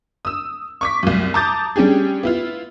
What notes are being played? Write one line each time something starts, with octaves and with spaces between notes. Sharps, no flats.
D#6 E6
C#6 D6 B6
C2 F#2
A5 A#5 D6 D#6 G6 A6
G3 C#4 D4 G4 G#4
B3 E4 F4